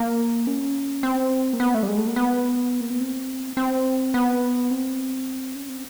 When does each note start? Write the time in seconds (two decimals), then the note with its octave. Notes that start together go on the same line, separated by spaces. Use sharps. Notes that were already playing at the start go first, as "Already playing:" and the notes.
Already playing: A#3
0.47 C#4
1.03 C4
1.53 A#3
1.60 B3
1.74 A3
1.83 G3
1.88 G#3
1.98 A3
2.07 A#3
2.16 B3
2.81 A#3
2.90 B3
3.01 C4
3.57 C4
4.14 B3
4.71 C4
5.55 C#4
5.69 C4